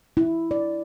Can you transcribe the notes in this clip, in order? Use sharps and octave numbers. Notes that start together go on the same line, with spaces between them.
E4
D5